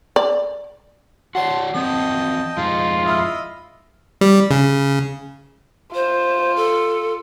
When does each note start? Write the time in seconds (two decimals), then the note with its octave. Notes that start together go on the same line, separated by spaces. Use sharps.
0.16 D5
1.35 F#4 C#5 D5 F#5 A5 C6
1.74 E3 F#3 C4 D#5 G5 A5
2.57 F2 G#3 D#4 F4
3.06 E4 D#5 E5 B5 F6
4.21 G3
4.51 C#3
5.94 F4 C5
6.56 A4